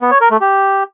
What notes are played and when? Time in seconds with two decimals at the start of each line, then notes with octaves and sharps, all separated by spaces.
0.01 B3
0.11 C#5
0.21 A#4
0.31 A3
0.41 G4